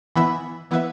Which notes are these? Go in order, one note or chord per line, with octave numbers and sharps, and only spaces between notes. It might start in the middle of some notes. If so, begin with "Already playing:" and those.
E3 B3 E4 B4 E5
E3 B3 E4 B4 E5